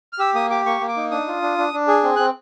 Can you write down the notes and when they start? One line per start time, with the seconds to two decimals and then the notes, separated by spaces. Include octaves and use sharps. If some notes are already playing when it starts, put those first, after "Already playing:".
0.13 F6
0.19 G4 E6
0.34 A#3 D#6
0.50 G4 D6
0.66 A#3 C#6
0.81 A#3
0.88 D6
0.97 D#4
1.11 D4 D#6
1.28 F4
1.42 D4
1.58 D4
1.73 D4
1.88 G#4
2.04 C4
2.16 C4 F#6